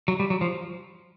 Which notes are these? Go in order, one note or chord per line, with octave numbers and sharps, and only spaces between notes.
F#3
G3
F#3
F3